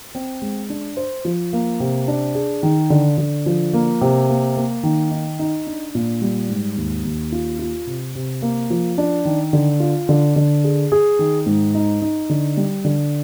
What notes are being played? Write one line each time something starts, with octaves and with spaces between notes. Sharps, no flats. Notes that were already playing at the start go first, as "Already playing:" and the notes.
C4
G#3
D4
C5
F3
A#3
C3
D4
G#4
D#3
D3
D3
F3
A#3
C3
A#3
A#3
D#3
D#4
D#4
D4
A#2
G3
G#2
D#2
D#2
F4
F4
C3
C3
A#3
F3
D4
D#3
D3
F4
D3
D3
G#4
G#4
D#3
G#2
D#4
D#4
D3
G3
D3